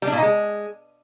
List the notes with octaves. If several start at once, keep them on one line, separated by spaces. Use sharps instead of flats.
G3
D4
A#2
D#4
G#3